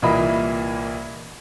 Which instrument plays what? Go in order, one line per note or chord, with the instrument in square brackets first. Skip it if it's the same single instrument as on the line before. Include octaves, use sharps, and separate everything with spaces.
[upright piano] C2 A#2 E3 A#3 D#5 B5